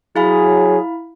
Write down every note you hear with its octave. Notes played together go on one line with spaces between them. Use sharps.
F#3 E4 G#4 F5 B5